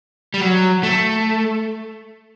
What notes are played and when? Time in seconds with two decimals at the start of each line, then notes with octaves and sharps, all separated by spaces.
0.34 G3
0.41 F#3
0.83 A3